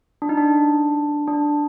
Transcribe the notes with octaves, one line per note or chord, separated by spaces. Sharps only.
D4
D#4
D4
D4